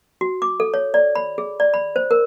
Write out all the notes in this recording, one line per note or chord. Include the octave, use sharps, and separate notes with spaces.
F#4
D6
A4
C#5
D5
B5
G#4
D5
B5
C5
A#4